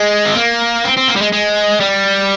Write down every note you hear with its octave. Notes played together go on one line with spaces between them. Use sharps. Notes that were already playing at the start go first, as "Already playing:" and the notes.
Already playing: G#3
C4
A#3
C4
C4
A#3
G3
G#3
G#3
G3